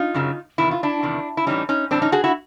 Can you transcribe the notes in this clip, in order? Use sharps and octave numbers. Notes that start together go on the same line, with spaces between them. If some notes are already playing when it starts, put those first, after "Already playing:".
Already playing: D#4 F4
F#2 C#3 F#3
E2 C3 D#3 E4
F4
D4 E4
E2 C3 D#3
E4
A2 E3 G3 C#4 D#4
C#4 D#4
A2 E3 G3 C4 D4
C#4 D#4
F#4 G#4
E4 F#4